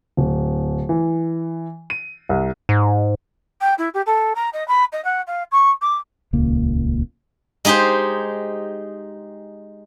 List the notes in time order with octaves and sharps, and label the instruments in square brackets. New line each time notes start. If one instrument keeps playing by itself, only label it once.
[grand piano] D1
E3
D#7
C2
[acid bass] G#2
[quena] G5
E4
G4
A4
A#5
D#5
B5
D#5
F#5
F5
C#6
D6
[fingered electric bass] D#1 C#2 A#3
[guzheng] G#3 D#4 G4 G#4 C5